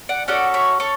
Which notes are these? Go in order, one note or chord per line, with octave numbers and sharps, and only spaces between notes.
D5 F#5
C#4 F#4 A4 D5 F#5
C#5 E5
A4 C#5